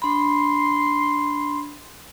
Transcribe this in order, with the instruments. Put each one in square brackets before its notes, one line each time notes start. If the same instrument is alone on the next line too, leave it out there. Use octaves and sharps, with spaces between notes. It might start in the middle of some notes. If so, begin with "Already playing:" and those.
[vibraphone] D4 B5 [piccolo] C6